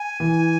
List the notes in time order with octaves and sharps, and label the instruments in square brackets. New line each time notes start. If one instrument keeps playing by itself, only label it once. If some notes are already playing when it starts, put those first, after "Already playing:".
Already playing: [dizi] G#5
[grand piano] E3